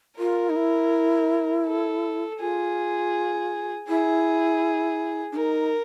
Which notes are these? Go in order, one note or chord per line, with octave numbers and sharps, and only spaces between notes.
F4 A#4
D#4
E4
A4
F4 G#4
E4 G#4
D4
D#4 A#4